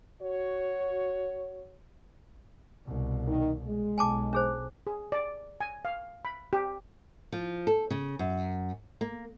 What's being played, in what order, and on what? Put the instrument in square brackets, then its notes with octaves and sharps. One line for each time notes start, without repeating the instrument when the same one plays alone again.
[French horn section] F#4 C#5
[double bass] C2 B2
[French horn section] D#3
G#3
[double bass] B1 [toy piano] G#5 A5 D6
[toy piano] D4 G#4 C5
[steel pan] G#4
D5
G#5
F5
B5
G4
[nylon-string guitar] F3
A4
C#3
F#2
A#3